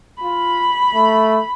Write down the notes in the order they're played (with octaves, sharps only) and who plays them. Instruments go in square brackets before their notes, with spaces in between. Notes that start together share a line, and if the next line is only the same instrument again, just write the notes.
[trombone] F4 [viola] B5
[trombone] A3